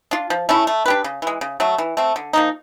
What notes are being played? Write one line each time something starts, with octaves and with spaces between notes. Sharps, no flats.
D4 F4
F3
A3 C#4 E4
A3
D4 G4 B4
C#3
E3 G#3
C#3
F#3 A3
E3
A3 C4
D3
F3 A#3 D#4